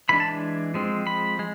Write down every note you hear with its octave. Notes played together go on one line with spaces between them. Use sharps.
E3 G#3 D4 B5
A5
F3 G#3 C4
B5
G#3